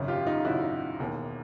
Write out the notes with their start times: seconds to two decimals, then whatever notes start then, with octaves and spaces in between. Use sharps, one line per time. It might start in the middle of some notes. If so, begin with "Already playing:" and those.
Already playing: G#1 F#2 C#3
0.08 F4 G4
0.27 D#4 F4
0.45 G#1 F#2 C#3 E4 F#4
1.00 E1 D#2 D#3